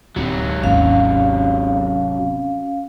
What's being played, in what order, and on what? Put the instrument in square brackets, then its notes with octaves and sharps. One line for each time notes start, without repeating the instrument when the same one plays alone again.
[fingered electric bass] D1 [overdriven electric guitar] C3 F#3
[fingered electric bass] G#1 D#2 [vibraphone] C#4 F5